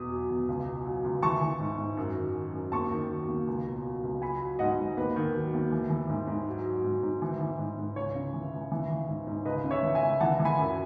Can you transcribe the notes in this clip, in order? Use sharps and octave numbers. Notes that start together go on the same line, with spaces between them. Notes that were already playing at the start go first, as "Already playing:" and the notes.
Already playing: E2 B2 D#6
F#3
E2
C#2
B2
F#3
C#2
E3 A5 C#6
E3
G#2
G#2
F#2
D#3
F#3
F#2
D#2 A5 C#6
D#3
F#3
D#2
C#2
B2
F#3
C#2
F#3 G#5 B5
F#3
G#2 D#5 F#5
G#2
D#2 B4
D#3
F#3
D#2
E3
E3
G#2
G#2
F#3
F#3
G#2
G#2
E3
E3
G#2
G#2
C#2 C#5
C#3
E3
C#2
E3
E3
G#2
G#2
C#2 B4 D#5
C#3
C#5 E5
E3
E5 G#5
C#2
E3 F#5 A5
E3
G#5 B5
F#2